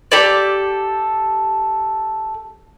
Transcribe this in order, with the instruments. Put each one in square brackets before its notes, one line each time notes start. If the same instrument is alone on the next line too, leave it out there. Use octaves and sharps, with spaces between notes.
[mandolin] G4 A4 D5